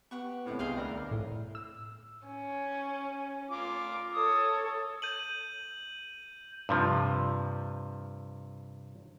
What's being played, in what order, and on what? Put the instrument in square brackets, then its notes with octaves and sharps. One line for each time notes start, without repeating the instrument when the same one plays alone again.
[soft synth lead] B3 [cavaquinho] G4 F#5 C#6
[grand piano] C2 C3 [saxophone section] A2
[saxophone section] G2 D#5 F5 [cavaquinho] G#4 G5 C6
[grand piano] D2 [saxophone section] B3 D4 A#4 [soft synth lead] D5
[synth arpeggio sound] A2
E6
[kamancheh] C#4
[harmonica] F4 D6
[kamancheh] A4 C#5 [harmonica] D#6
[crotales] G6 D#7 F#7
[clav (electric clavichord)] G2 C3 F3